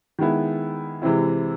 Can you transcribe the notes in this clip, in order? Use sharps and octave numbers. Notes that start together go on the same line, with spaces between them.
D#3 G#3 B3 E4
C3 E3 G#3 C4 E4